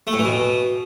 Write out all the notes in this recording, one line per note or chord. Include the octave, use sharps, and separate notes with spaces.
A3
A2
E3
B2